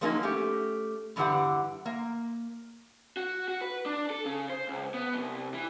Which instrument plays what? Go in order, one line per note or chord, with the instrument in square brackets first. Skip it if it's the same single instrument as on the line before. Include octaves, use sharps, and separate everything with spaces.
[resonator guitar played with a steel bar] F3 F#3 G#3 A#3 C#4 D#4
A3 C#4 G4
E2 G2 D3 E3 G4 F#5
A#3
[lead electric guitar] F#4
F#4
B4
D4
A4
C#3
C5
C#2
B3
C2
E3